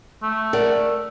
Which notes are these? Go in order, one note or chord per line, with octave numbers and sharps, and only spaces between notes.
A3
A#4 D5 F#5